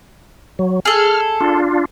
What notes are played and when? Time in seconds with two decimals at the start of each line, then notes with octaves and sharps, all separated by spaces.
0.59 F#3
0.85 G#4 A4 F6
1.41 D4 F4